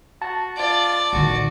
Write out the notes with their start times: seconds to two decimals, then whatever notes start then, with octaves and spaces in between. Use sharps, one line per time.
0.22 F#4 A5
0.58 F4 D5
1.13 A#1 D#3 F#4